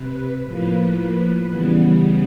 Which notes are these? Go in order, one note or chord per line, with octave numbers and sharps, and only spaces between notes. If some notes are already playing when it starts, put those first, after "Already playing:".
Already playing: C3 B4
A2 F3 A#3 B4
C#3 E3 G3 B3